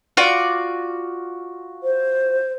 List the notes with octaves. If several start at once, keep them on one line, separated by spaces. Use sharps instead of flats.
F4 F#4 D5
C5